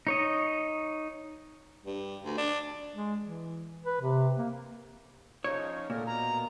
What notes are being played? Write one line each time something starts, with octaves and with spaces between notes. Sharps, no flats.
D#4 C#5 D#5
G2
D2
D4
G#3
E3
B4
C3
A#3
C#3 F3 D#4 C#5
A#2 D3 A3 A#4
B2 A#3 A#5